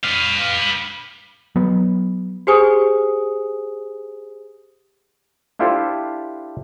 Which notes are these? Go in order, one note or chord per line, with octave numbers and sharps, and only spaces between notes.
B4 F5
F#3 B3
G4 G#4 C5 G#5 D#6
D4 E4 F4 G4 A4 C5